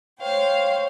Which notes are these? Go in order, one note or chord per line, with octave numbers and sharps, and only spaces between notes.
C5 C#5 F5 G5